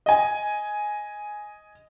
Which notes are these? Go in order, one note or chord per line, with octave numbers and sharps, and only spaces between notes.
D#5 G#5